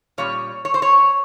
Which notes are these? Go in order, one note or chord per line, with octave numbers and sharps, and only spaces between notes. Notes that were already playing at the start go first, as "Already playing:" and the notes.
A#2 G3 C#4 C#5
C#5
C5
C#5